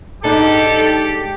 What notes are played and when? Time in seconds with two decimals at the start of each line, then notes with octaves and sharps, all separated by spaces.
0.24 G#2 D4 D#4 G4 A4